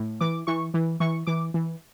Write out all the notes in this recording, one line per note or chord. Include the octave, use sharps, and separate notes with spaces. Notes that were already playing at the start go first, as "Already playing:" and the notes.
Already playing: A2
E3 D6
E3 C#6
E3
E3 C#6
E3 D6
E3